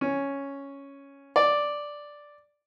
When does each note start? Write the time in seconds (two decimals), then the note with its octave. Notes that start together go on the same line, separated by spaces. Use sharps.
0.01 C#4
1.36 D5